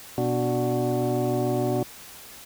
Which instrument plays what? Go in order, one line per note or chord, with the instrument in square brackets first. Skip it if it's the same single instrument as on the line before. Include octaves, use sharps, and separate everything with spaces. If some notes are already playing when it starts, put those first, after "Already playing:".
[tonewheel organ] B2 D4 F#4